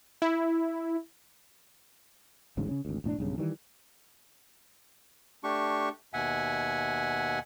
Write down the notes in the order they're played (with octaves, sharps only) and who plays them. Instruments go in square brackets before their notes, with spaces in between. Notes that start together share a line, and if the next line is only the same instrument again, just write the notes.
[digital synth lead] E4
[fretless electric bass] A1 D2 G#2 C#3
C#3 C#4
G#1 D2
E1 A2 C#4 D4
B1 G2 C#3
D#3 E3 G3
[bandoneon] A3 D4 G4 C#6
D#2 B2 E5 F#5 G#5